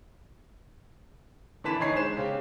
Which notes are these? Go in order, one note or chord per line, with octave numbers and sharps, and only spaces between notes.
D3 E3 B4 A5 B6 E7
D3 D#4 C#5 D#5 G#5 C7
G#3 C5 E7
C#3 G4